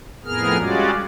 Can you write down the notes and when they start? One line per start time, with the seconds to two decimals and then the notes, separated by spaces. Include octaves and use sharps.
0.25 F2 A2 B3 G#4 A#4 F6
0.59 G3 G#3 C#4 F4 F#4 D5